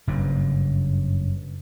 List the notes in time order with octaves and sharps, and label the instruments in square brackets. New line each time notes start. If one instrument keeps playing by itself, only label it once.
[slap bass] F#1 G2 C#3